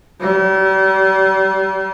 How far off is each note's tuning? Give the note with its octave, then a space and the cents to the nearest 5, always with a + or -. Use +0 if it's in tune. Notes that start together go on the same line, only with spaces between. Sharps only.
G3 -40